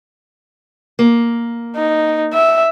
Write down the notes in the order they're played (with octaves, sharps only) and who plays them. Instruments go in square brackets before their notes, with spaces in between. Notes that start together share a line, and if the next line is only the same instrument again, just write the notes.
[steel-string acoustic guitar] A#3
[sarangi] D#4
E5